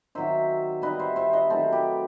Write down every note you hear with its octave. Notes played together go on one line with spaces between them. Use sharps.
D#3 F#3 C4 C5 E5
D#3 G3 C4 B4 D#5
C5 E5
C5 E5
B4 D#5
D#3 F#3 A3 C4 A4 C5
G4 B4